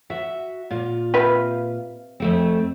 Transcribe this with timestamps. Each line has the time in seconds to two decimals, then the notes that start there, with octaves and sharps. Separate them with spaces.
0.10 F#4 E5
0.70 A#2 F4
1.14 C3 B4 F5
2.20 F2 A3 C4